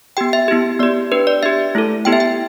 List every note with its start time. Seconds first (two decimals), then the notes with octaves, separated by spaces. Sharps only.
0.17 B3 G4 G5
0.33 E5
0.48 B3 E4 G4
0.79 B3 G4 D5
1.12 D4 G4 B4
1.27 D5
1.43 D4 G4 E5
1.75 A3 E4 A4
2.05 B3 E4 G4 G5
2.13 E5
2.20 G5